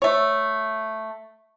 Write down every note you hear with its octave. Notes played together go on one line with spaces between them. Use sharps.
A3 C#5